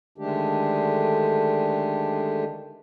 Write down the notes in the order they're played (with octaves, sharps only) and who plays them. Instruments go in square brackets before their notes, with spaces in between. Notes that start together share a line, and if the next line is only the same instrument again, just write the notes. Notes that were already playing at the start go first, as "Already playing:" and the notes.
[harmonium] D3 D#3 G#3 A3 D4 G4